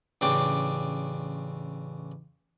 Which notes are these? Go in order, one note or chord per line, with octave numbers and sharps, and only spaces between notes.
A1 C#3 D4 G5 D6